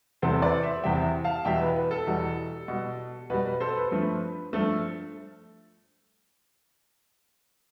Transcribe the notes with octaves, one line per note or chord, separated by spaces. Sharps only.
E2 C3 G3 A4 C5
B4 D5
C5 E5
E2 C3 G3 E5 G5
F5 A5
E2 B2 G3 E5 G5
B4
B4
A4
E2 B2 G3
B2 G3
B2 G3 B4
B4
A4 C5
B4
G2 F3 A3
G2 F3 A3 A4